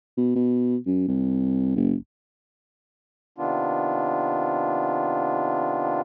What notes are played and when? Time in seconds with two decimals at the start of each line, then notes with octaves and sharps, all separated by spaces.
0.18 B2
0.36 B2
0.86 F#2
1.08 C2
1.76 F#1
3.38 C3 D#3 B3 D4 F4